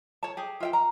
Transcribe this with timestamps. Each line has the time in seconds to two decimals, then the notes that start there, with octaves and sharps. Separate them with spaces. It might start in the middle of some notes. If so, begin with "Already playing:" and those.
0.23 C#5 A5
0.37 G4 G#4
0.60 F4 E5 G5
0.73 A#5